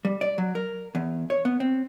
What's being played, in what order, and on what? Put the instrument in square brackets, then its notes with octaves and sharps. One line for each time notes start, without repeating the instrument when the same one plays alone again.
[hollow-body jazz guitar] G3
D5
F#3
A#4
E2
C#5
B3
C4